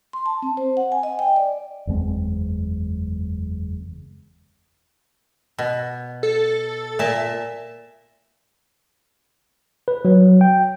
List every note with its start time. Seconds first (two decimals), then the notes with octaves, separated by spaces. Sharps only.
0.13 C6
0.26 A5
0.42 C4
0.57 C5
0.77 F#5
0.92 G#5
1.03 D#5
1.19 G5
1.36 D5
1.87 F#1 E2 G#3 C4
5.58 B2
6.23 A4
6.99 A#2 E5 A5
9.88 B4
10.05 F#3
10.41 G5